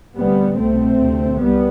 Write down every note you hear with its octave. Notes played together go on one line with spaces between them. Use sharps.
D2 C3 G3 B3
C2 B2 A3 C4
D2 C3
C2 G3 B3